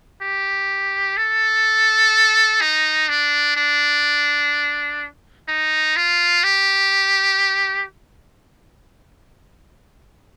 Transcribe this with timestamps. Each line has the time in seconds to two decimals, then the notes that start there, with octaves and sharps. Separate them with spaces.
0.21 G4
1.17 A4
2.61 D#4
3.09 D4
3.56 D4
5.48 D#4
5.96 F4
6.44 G4